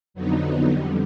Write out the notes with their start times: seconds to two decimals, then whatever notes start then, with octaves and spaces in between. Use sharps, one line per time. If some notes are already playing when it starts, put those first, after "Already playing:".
0.14 F2 D3 F#3 B3 D#4
0.68 F2 D3 G3